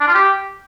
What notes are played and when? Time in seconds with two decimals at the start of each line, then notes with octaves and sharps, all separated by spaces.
0.01 D4
0.08 F4
0.15 G4